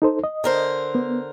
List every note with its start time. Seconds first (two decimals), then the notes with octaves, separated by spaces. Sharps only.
0.02 D#4 A4 C5
0.24 D#5
0.44 D3 A#4 C5
0.95 B3